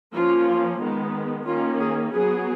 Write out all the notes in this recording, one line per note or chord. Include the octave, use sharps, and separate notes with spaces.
F3 A#3 C#4 F4
D#3 G#3 B3
D#3 A#3 C#4 F4
G#4
F#3 B3 G#4